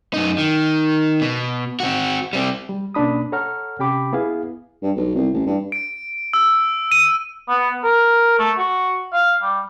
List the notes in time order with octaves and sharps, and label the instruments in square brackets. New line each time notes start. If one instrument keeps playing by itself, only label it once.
[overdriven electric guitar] F#2 D#4
D#3
B2
C4 F#4
G3 C4
[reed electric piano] G3
B2 A#3 C#4 D4 B5 D#6
A4 C#5 F#5 A#5 F6
C3 C#4 G4 G5 B5 D6
B3 E4 G#4 F5
[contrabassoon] G2
B1
C2
A1
G2
[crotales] D7
E6
D#7
[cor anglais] B3
A#4
A3
F#4
F5
G3